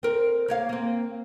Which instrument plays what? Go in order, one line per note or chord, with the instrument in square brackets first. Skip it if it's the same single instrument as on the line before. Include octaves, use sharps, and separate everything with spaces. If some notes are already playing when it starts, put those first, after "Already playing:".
[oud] C4 A#4
A#3 C#5 F5
A#3 C4